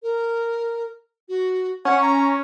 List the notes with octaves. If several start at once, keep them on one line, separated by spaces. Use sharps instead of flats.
A#4
F#4
C#4 F#5
A#5